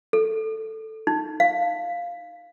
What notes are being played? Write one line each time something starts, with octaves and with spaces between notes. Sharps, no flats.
A4
D#4
F5